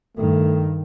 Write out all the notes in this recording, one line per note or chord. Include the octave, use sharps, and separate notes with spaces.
G2 D#3 A3